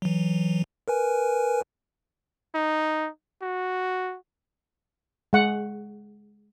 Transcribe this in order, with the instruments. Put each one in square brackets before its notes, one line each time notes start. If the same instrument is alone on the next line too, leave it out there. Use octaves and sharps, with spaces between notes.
[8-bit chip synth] E3 F#3
A#4 B4 G#5
[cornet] D#4
F#4
[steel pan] G#3 F#5